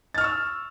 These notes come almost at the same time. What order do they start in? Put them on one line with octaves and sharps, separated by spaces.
A6 F6 C#6 E6